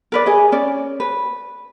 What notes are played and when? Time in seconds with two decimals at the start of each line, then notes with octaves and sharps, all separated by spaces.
0.12 A#4 B4 D5
0.26 G#4 D#5
0.52 C#4 D5
1.00 B4